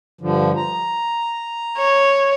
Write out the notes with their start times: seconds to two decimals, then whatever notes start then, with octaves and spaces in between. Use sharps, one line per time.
0.21 G2 D3 F3
0.57 A#5
1.77 C#5